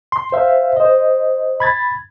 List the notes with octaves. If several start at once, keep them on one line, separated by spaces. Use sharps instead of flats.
C6
C5 E5 F5
C5 D#5
B5 G#6 A6